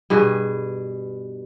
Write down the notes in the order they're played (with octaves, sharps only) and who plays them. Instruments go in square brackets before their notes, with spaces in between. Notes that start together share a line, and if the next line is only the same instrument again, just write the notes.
[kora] G2 B2 G#4